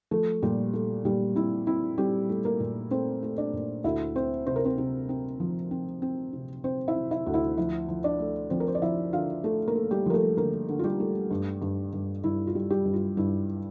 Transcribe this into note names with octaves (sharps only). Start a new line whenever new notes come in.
F3 A3 A4
A#2 G3 G4
A3
A#2 G3 G4
C4 E4
C4 E4
G3 C4 G4
A3
A#3 A#4
A#2
A3 C4 C5
A3
D4 D5
A#2
D2 E4 E5
C4 C5
C3 C5
A#4
C4 C5
C3
C4
F3
C4
C4
C3
C4 C5
E4 E5
C3
E4 E5
D2
E4 E5
F3 E4 E5
F3
D4 D5
A3
F3 C4 C5
A#4
C5
D5
F3 E4 E5
D3 F4 F5
A3 A4
A#3 A#4
A3
G3 G4
F3 A#4
A3 A4
D3 A#3 A#4
D3
F4
G3 G4
A3
G2
G2
G2
G2 E4
F4
G3
G3 G4
G2
F4
G2 E4